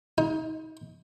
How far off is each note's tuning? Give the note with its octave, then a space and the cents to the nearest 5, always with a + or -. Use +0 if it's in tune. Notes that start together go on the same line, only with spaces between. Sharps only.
D#4 +30